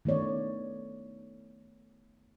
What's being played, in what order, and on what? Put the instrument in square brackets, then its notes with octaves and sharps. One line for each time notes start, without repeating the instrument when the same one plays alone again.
[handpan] D#3 A3 B3 C#5 D5